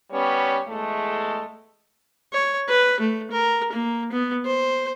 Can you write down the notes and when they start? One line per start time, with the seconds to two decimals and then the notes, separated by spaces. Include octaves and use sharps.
0.12 G3 B3 C#4 C#5
0.68 E2 G#3 A3
2.33 C#5
2.69 B4
3.00 A3
3.31 A#4
3.73 A#3
4.12 B3
4.45 C5